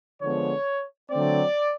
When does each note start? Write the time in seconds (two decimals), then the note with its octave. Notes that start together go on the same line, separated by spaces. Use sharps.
0.21 D3 F3 G#3 B3 C#5
1.11 D3 F#3 A3 C4 D5